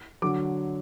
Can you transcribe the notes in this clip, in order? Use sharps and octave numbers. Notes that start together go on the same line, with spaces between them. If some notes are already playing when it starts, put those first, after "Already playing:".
D3 F#3 D6